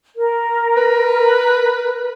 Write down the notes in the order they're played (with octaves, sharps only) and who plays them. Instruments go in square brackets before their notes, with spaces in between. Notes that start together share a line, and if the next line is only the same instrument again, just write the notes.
[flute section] A#4
[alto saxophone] B4